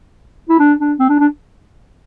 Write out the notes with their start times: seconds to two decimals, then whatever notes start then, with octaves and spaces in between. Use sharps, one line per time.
0.49 E4
0.59 D4
0.79 D4
0.99 C4
1.09 D4
1.19 D4